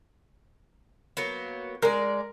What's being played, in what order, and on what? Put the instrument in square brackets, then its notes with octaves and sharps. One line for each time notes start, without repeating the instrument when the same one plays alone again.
[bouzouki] F#3 A#3 B3
[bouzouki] G#3 D5 [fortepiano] A#4